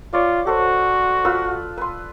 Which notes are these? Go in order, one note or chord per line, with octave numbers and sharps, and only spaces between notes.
F4 C#5 D5
F#4 A4 C5
F4 B4 E6
B4 C6